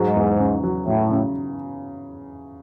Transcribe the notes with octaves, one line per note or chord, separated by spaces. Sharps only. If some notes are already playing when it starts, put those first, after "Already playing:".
Already playing: G#2 F#3
E2
C#3
F#3
A2 F#3
C#3